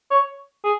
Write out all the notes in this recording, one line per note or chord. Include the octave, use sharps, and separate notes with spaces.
C#5
G#4